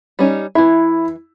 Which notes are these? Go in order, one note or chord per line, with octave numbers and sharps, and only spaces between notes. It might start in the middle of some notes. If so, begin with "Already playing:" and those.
G3 C#4 D#4
E3 E4 E5